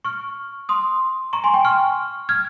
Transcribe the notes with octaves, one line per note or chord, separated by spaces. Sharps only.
C#6 F6
C6 D#6
A#5 C#6
G#5 C6
G5
C#6 F6
F6 G#6